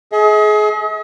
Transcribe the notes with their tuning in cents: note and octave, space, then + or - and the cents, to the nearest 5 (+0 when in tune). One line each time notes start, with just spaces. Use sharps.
G#4 +30 D#5 +45